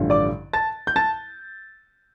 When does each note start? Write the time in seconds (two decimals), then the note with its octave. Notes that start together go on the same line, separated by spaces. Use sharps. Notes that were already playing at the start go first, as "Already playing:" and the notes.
Already playing: A1 G2 D3 F3
0.10 D5 D6
0.53 A5 A6
0.87 G6
0.96 A5 A6